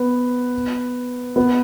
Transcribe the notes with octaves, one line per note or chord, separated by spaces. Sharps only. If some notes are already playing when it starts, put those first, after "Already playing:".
Already playing: B3
B3